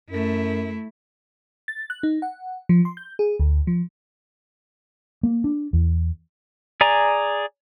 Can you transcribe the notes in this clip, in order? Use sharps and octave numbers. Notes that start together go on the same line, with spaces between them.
F#2 A3 E4
A6
F#6
D#4
F#5
F3
C6
G6
G#4
D2
F3
A#3
D4
E2
G#4 D5 G#5 A#5